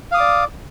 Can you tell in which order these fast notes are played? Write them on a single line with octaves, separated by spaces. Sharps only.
F5 D#6 D6 D5